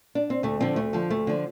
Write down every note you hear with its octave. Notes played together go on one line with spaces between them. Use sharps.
D4
C4
D2 A3
D3 F3 C4
D2 A3
D3 F3
D2 A3
D3 F3